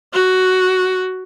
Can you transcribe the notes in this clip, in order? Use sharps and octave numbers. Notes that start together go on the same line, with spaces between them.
F#4